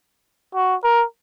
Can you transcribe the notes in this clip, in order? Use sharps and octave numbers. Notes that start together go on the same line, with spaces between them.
F#4
A#4